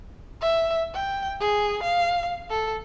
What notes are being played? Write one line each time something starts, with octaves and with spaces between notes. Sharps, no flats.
E5
G5
G#4
F5
A4